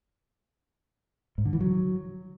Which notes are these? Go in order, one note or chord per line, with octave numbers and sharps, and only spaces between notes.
G#2
D3
E3
F#3